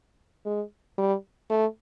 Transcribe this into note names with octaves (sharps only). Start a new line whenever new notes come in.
G#3
G3
A3